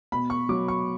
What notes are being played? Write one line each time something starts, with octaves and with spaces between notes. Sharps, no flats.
B2 B5
C#6
F#3 D6
C#6